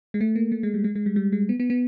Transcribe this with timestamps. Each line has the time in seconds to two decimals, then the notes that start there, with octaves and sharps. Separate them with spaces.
0.14 G#3
0.21 A3
0.36 A#3
0.52 A3
0.63 G#3
0.74 G3
0.84 G#3
0.95 G#3
1.06 G3
1.16 G3
1.32 G#3
1.49 B3
1.60 B3
1.70 B3